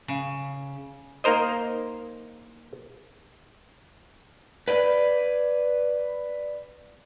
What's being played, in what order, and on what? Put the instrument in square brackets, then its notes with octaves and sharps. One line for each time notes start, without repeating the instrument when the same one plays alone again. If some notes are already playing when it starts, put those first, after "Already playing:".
[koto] C#3
[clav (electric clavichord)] A#3 D#4 A#4 C5 D#5
[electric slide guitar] B4 D5